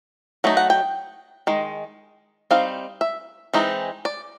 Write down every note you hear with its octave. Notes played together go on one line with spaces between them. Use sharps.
F#3 A3 D#4
F#5
G5
D#3 G#3
G3 C4 D#4 F5
E5
E3 G#3 C4 D#4
D5